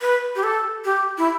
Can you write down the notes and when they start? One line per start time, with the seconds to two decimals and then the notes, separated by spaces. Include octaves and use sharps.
0.02 B4
0.36 G4
0.43 A4
0.85 G4
1.18 E4